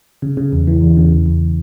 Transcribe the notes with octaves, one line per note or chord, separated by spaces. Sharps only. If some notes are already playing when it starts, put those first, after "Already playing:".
C#3
C#3
E2
E3
E2
C#3
E2
E2